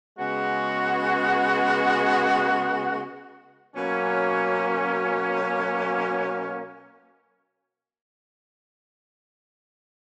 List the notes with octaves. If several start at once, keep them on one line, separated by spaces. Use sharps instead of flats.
C#3 G#3 B3 F#4
B2 F#3 A#3 C#4